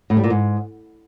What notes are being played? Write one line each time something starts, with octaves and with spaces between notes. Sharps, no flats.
A2
G3
A#2
G#2